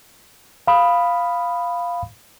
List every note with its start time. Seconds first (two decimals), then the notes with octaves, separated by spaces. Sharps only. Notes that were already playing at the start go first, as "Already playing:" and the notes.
0.67 F5 B5 D#6